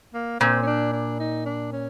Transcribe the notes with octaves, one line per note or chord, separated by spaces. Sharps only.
A#3
A#2 C4
C#4
D4
D4
D#4
D4
C#4